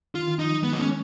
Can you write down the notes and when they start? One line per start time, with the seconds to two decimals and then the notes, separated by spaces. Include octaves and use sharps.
0.15 D#3 F4
0.27 D#3
0.39 F3 D#4
0.51 F#3
0.63 G#3 B3
0.72 A#3 D#4
0.79 G#3 C#4